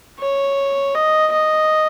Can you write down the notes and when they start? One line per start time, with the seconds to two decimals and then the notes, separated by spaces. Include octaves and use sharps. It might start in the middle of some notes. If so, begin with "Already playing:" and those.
0.19 C#5
0.95 D#5
1.32 D#5